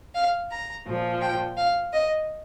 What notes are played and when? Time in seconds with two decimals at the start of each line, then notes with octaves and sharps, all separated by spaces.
0.14 F5
0.50 A#5
0.86 A#2 F3
1.21 G5
1.57 F5
1.92 D#5